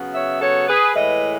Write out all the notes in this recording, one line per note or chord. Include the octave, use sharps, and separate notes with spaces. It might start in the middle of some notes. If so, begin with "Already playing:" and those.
Already playing: C#3 F#3 B3
C#5 E5
A4 C#5
G#4 B4
A2 E3 G#3 B4 D#5